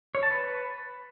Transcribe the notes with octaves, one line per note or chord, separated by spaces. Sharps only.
C#5
A5
B4